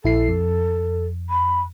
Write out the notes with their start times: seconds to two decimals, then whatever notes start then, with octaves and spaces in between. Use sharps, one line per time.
0.04 A#1 E4 A4 C7
0.28 F2
1.30 B5